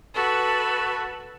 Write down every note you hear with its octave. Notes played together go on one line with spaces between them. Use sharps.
F#4 A4 B4